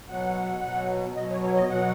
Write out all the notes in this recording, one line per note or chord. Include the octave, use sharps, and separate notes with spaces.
B2 F#3 F#5
B2 F#3
B2 F#3 D#5
C#5
C#5
D#5
B2 F#3 F#5